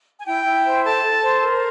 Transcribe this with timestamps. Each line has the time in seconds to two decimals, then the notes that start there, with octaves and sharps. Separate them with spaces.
0.18 G#5
0.26 E4 G5
0.45 E4
0.65 C5
0.84 A4 A5
1.02 A4
1.22 C5
1.41 A#4